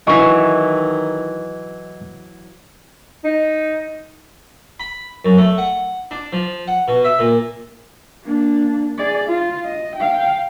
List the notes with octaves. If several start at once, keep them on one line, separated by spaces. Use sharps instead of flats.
D#3 E3 F#3 D#5 G#5 C#6
D#4
B5
F#2
A3
F#5
D4
F3
F#5
B2
E5
A#2
A#3 D4
G#4 D5
F4
D#5
F5 G5